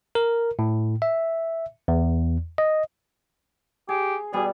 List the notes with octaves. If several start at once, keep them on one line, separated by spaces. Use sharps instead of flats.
A#4
A2
E5
E2
D#5
G4 G#4
B2 G3 G#4 D5